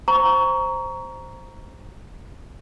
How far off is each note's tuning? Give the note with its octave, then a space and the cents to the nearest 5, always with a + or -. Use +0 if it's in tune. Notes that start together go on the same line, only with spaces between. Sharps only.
C5 +0 A#5 +0 C#6 +25